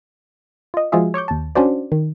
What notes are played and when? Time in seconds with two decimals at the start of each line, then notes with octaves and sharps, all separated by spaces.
0.74 F4 D#5
0.92 F3 G#3 F4 F#4 G#4 E5
1.14 C#5 C#6 D6 G6
1.28 D#2 A5
1.55 C#4 D4 F#4 C5 D5
1.92 D#3